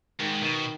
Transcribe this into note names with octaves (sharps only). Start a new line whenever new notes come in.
G#2 D#3
B2 D#3